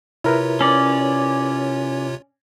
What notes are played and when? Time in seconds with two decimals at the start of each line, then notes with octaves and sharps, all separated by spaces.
0.24 C3 E4 F4 A#4 B4 C#5
0.61 C#4 D5